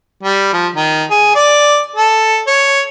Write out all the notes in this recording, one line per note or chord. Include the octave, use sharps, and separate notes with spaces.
G3
F3
D#3
G#4
D5
A4
C#5